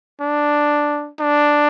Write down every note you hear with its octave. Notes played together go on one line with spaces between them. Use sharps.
D4
D4